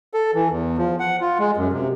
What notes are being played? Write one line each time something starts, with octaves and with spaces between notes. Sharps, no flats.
A4
E3
E2
F3
F#5
F4
G#3
F#2
C3